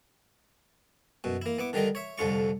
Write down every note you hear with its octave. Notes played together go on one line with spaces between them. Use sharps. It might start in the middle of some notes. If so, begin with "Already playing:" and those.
F#2 B2
A#3 E4
B3 E4 D6
D3 D#3 G3 D#4 A#4
C#5 E5
C2 F2 D3 F4 C#6